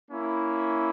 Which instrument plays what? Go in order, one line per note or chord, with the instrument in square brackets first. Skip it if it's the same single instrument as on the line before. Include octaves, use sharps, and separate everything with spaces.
[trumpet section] A#3 C#4 E4